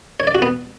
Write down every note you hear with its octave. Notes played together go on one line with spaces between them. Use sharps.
C#5
D5
F#4
B3